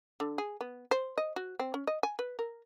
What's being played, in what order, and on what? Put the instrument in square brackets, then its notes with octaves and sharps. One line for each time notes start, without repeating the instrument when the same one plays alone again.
[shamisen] D3
G#4
B3
C5
D#5
F#4
C4
C#4
D#5
G#5
B4
A#4